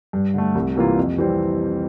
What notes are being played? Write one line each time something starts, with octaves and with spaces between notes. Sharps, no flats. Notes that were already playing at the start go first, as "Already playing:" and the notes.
G2
D3 A3
C2
C3 E3 A#3 F4
F2
E3 G3 C4